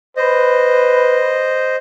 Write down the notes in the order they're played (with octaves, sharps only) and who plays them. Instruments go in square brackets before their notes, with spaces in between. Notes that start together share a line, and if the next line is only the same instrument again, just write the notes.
[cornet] B4 [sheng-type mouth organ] C5 D#5